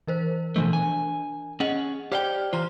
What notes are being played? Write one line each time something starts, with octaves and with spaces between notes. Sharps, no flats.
E3 A#4 C5
B2 E3 F3 A3 D4
G#5
C#4 G#4 D#5 F#5
G4 C5 D5 F5 G5 F6
E3 F4 C5 A#5 C6